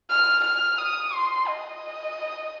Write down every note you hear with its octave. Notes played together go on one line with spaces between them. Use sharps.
F6
F6
D#6
C6
D#5